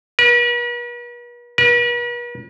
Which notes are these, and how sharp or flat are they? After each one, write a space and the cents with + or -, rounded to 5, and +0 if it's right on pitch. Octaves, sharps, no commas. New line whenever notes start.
B4 -45
B4 -45